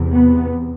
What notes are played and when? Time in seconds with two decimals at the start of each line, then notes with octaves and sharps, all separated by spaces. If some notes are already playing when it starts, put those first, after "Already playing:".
Already playing: E2 C3
0.11 B3